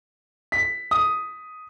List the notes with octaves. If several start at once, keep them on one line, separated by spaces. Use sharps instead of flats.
B6
D#6